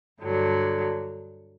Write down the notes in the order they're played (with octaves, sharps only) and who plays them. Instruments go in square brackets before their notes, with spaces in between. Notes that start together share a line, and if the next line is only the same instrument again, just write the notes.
[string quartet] G2 D3 F#3